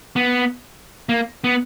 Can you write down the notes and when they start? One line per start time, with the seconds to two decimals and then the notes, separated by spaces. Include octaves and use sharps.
0.16 B3
1.09 A#3
1.44 B3